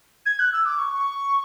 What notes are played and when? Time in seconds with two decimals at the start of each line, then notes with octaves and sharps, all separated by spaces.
0.26 G#6
0.39 F#6
0.53 E6
0.65 D6
0.78 C#6
0.94 C#6